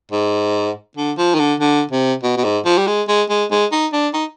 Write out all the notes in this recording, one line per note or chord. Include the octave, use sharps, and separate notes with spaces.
G#2
D3
F3
D#3
D3
D3
C3
B2
B2
G#2
F3
G3
G#3
G#3
G#3
G#3
D#4
D4
D#4